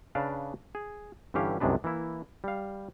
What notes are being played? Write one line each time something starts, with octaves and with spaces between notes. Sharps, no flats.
C#3 D4 B4 D5 F5 A5
G#4
G2 D3 E3 C#4 G4 F5
C2 F#2 C3 G#3 D4 B4
E3 A#3 E4
G3 F5